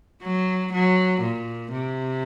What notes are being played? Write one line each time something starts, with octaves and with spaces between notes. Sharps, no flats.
F#3
F#3
A#2
C3